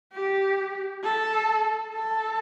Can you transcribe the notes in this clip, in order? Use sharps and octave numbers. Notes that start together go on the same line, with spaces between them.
G4
A4
A4